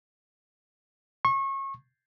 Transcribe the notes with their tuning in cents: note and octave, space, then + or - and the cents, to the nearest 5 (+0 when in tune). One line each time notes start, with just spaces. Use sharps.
C#6 -30